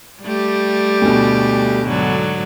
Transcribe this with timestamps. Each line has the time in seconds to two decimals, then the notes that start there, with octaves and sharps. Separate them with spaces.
0.23 G3 A3 G4
1.02 D2 B2
1.88 G#2 D3 F#3